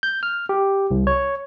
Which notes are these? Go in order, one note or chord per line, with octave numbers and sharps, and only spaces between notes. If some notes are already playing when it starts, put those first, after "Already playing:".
G6
F6
G4
C2
C#5